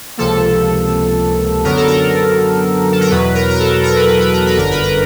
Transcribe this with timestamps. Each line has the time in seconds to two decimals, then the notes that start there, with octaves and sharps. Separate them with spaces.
0.17 C#2 C3 F3 A#3 A4
1.64 F#2 D3 F#3 B3 A#4
1.77 A4
1.88 A#4
2.93 A4
3.01 A#4
3.10 E2 B2 F#3 B4
3.35 A#4
3.50 A#4
3.60 A4
3.84 A#4
3.97 B4
4.08 A#4
4.21 B4
4.34 A#4
4.46 B4
4.57 G1 F#2 D3 A#4
4.71 B4
4.83 A#4